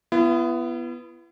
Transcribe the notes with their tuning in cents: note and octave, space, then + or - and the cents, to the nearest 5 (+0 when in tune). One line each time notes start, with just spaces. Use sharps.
B3 +0 E4 +40